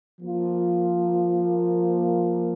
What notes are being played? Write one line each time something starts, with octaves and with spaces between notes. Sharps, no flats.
F3 A#3 F4